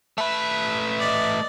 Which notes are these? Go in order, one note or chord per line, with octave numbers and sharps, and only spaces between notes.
A3 B4 E5
D5 D#5